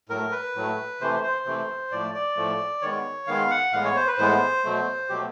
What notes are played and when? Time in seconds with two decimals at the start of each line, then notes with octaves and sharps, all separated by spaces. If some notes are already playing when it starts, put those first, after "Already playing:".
0.09 A2 F#3 A3 A#4
0.32 B4
0.55 A2 F#3 A3
1.00 C3 E3 A3 C5
1.24 C5
1.46 C3 E3 A3
1.91 A2 F3 A3 D5
2.14 D5
2.37 A2 F3 A3
2.82 D#3 G#3 B3 C#5
3.27 D#3 G#3 B3 F5
3.51 F#5
3.72 A2 E3 G#3 B3 F5
3.84 C#5
3.96 C5
4.08 B4
4.18 A2 E3 G#3 B3 C5
4.64 B2 F#3 A3
5.09 B2 F#3 A3 G4